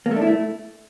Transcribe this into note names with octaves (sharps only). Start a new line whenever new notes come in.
A#3
A3
D4
E4
A3